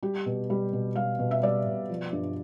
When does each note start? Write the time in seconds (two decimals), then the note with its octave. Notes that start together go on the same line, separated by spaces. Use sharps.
0.03 G3 G4
0.26 B2
0.50 G3
0.73 B2
0.96 G3 F5
1.19 B2
1.31 E5
1.42 G3 D5
1.67 B2
1.89 F3
2.13 G2